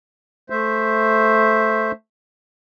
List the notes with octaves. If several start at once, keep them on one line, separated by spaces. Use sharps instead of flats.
A3 C5 E5